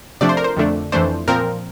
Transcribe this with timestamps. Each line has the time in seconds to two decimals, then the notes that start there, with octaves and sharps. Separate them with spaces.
0.21 C3 F3 A3 D4 D5
0.29 C5
0.37 A#4
0.44 C5
0.56 F2 D3 A3 D4
0.92 F2 E3 A3 D4 C5
1.28 A#2 F3 C4 A#4